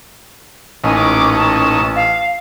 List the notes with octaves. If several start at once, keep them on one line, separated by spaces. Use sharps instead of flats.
A1 A#2 C#4 D#4 G#5
D6
A5
F5